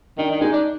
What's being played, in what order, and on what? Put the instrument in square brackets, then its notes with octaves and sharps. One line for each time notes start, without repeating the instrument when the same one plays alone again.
[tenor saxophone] D#3 [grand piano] D4
[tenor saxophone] D#3
[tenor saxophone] G#3 [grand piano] D#4
[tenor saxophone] D4